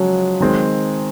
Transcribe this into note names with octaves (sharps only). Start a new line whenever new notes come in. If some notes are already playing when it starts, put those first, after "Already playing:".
Already playing: C#3 F3 F#3 G#3
D#3 G#3 C4